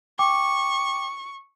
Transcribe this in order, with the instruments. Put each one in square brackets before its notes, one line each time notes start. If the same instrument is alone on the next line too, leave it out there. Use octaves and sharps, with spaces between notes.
[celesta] G5 D6 [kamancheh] C#6